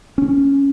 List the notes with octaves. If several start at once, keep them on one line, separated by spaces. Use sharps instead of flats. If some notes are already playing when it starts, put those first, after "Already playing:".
C#4